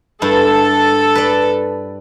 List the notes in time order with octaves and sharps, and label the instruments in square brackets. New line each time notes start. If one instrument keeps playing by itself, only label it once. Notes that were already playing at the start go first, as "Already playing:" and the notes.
[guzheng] G2 E4 [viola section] A4
[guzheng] B4 D5